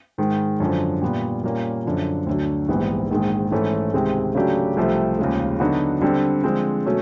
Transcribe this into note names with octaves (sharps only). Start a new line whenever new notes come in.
G#2 D#3 G#3
F#2 D3 F3
A#2 G3 B3
A#2 G3 A#3 C#4
F#2 D3 F3
D2 D3 F#3
A#1 G#2 E3 G3 B3
A#1 G#2 D#3 G#3
G#2 E3 A3 C#4
C#2 C3 D#3 G#3 C4
C#3 F#3 A3 D4 G4
C2 C3 F3 A3
D#2 C#3 F3 G#3
D3 F#3 B3 D#4 F#4
D3 G3 C4
D3 F3 G#3 C4
B2 F#3 A3 C#4